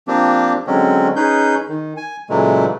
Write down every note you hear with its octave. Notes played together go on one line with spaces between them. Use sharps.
F3 A#3 C4 D4 G4
D3 F#3 G#3 C4 C#4
C#4 D#4 G#4 B4 G6
D#3
G#5
A#2 C#3 E3 F#3 G#3 A3